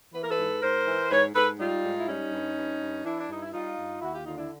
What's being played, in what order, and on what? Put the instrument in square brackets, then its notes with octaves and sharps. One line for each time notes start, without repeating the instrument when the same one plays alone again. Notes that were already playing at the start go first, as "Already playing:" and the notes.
[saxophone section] E3 B4
A#4
A4 B4
G#2
G#2 A#4 C5
E3
G#2 B4 C#5
G#2 A4 B4
G3 D#4 F4
G#2
E4
G3 C#4 D#4
G2
G2
G2
E3 D4 E4
D4
G2 D#4
E4
G3 D#4 F4
G2
D#2 E4 F#4
F4 G4
D3 D#4 F4
D4 E4